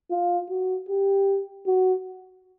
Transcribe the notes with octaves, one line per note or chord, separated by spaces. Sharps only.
F4
F#4
G4
F#4